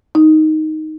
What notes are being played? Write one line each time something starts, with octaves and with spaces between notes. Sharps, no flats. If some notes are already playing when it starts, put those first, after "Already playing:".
D#4